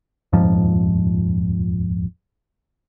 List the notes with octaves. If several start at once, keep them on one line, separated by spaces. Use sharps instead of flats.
D#1 F2 G#2 F3